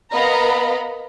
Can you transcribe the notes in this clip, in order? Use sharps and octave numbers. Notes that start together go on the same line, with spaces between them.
B3 A#4 D#5 F5 A#5 B5